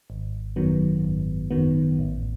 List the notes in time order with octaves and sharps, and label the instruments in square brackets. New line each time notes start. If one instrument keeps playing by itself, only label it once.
[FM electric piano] G#1
F#2 D#3 F#3 B3
G#1
F#2 D#3 F#3 B3
A1